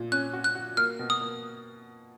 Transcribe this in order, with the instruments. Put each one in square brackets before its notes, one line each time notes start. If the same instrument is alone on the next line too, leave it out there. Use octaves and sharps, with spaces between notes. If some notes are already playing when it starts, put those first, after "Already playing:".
Already playing: [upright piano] A#2
[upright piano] C#4 [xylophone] F#6
[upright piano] F#4
[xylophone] F#6
[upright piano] F#4
[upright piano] A#3 [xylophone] F6
[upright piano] B2
[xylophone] D#6
[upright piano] A#3